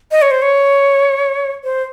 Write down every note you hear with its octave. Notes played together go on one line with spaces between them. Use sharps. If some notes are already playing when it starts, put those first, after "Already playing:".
D#5
C#5
C5
C#5
C5